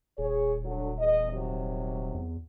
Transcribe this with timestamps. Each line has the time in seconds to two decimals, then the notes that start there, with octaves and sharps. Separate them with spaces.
0.18 D#1 G#4 C#5
0.65 D3 F#3
0.99 E2 D#5
1.32 C3 D#3 F#3
2.14 E2